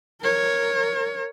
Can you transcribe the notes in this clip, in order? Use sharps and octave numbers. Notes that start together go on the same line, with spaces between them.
A#4 C#5